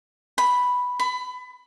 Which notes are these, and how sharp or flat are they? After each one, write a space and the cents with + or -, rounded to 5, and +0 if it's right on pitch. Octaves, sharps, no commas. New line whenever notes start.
B5 +0
B5 +25